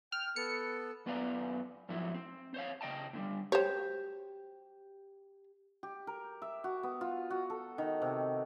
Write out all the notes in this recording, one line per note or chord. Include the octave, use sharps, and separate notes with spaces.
G5 F6
B3 A4 C#7
F#2 B3 B4 D5 F5 A#5
G#2 F3 F#3 E4
C4
C5 C#5 F5
C#3 D#5 G5 A5
A2 D3 G3
G4 C5 C#5
G4
A#4
E5
F#4
B3
F4
F#4
A4
D#3
C3